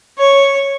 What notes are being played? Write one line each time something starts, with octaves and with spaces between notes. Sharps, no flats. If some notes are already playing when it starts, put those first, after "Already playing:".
C#5